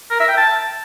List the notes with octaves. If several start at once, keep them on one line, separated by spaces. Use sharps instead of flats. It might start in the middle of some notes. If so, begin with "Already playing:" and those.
A#4
E5
G5
A5